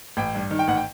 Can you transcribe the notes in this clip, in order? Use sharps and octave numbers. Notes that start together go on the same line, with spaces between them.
A1 G5
G2
D#3
G5
A1 F#5
G5